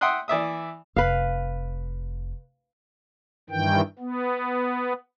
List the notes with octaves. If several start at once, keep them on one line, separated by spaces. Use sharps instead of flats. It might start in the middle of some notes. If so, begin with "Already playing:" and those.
E5 F#5 G5 C6 D#6 F#6
E3 D5 E5 D#6
F1 B4 F5
G2 D#3 E3 G5
B3